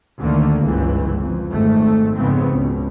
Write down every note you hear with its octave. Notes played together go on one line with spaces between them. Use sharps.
D2 D3 D#3 A3 A#3
G1 C#2 G#2 E3
F2
G#1 D#3 A3
F2 G#2 C#3 B3 C4
C#2 B2